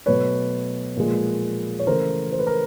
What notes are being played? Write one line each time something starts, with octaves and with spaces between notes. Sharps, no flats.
B2 F#3 A3 B4 C#5
A#2 F3 G#3
C#5
C#3 E3 A3 A#4 C5
C5
B4
A#4